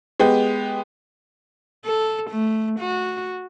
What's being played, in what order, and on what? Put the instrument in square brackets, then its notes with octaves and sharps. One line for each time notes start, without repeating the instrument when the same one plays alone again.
[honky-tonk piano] G#3 B3 G4
[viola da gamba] A4
A3
F#4